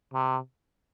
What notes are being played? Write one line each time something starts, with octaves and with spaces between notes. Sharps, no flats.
C3